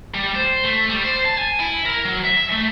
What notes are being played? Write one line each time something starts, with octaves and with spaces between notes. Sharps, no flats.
G3
C5
A3
G3
C5
A5
G#5
E4
A#4
F#3
E5
A3